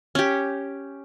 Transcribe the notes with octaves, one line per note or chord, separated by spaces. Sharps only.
C#4 G4